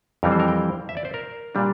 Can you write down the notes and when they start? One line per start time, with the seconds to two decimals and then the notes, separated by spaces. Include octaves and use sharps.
0.23 F2 E3 G3 C4 A#4
0.32 C5
0.40 A#4
0.48 G5
0.89 E5
0.97 D5
1.05 C5
1.14 A#4
1.55 A#2 G3 D4